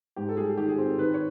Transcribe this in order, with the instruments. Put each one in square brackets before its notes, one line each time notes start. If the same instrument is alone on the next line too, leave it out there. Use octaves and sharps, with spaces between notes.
[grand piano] G#2 G4
A4
G3 G#4
D#3 G4
G#4
C4
A4
D#3 B4
C#5